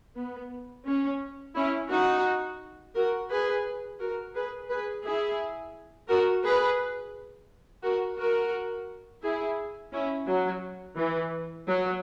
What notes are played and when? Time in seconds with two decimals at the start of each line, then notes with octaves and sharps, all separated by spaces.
0.17 B3
0.86 C#4
1.56 C#4 E4
1.91 D#4 F#4
2.95 F#4 A#4
3.30 G#4 B4
4.00 F#4 A#4
4.35 G#4 B4
4.70 G#4 B4
5.04 E4 G#4
6.09 F#4 A#4
6.44 G#4 B4
7.83 F#4 A#4
8.18 F#4 A#4
9.23 E4 G#4
9.93 C#4 E4
10.27 F#3
10.97 E3
11.67 F#3